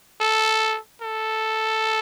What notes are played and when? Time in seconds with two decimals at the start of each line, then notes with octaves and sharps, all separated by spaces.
0.21 A4
1.02 A4